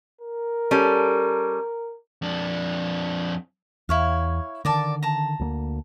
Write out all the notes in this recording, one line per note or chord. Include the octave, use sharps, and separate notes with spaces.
A#4
G3 C#4 A4
F2 D4
E2 E4 C#5 F5
D3 D#3 A#4 D5 A5
A5 A#5
D2 F#3 A#3